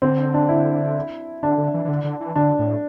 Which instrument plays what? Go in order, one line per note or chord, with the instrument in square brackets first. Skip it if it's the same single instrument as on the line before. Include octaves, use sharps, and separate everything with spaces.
[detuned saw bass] D3 [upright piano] C4
[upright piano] D4
E4
[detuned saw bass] D3 [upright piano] D4
[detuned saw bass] D3
E3
E3
D3
D3
E3
[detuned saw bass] D3 [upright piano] D4
[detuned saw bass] A2